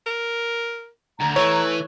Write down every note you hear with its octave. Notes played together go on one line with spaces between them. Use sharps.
A#4
D2 A#5
E3 A3 C#5